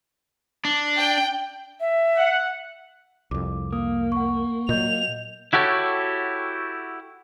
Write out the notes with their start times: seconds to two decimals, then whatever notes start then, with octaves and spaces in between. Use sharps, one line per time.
0.65 D4
0.98 G5
1.80 E5
2.17 F#5
3.31 C2 F2 D6
3.73 A#3 D#6
4.12 F#5 C#6
4.69 A#2 F#3 D#5 G6 F7
5.53 E4 F#4 G4 A4 C#5